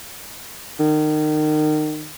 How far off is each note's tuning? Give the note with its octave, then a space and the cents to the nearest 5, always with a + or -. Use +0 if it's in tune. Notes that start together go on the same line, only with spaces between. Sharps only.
D#3 -30